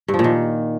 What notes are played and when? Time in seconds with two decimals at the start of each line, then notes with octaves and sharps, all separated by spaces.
0.08 G2
0.14 F3
0.19 A#2
0.24 D#3